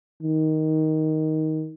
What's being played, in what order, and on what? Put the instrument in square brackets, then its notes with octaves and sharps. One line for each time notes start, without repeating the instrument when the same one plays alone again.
[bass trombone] D#3